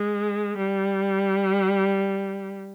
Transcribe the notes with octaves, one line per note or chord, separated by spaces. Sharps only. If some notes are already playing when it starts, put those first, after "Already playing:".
Already playing: G#3
G3